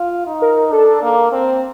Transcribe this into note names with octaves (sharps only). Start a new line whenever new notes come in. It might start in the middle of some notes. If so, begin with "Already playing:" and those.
Already playing: F4
D#4
A#4
D4 A4
A#3
C4